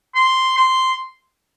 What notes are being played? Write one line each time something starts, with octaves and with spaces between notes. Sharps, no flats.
C6
C6